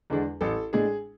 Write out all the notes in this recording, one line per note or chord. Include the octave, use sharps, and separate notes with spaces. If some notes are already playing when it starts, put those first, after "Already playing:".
E2 D3 G#3 D4
A1 A4
A2 G#3 D4 G#4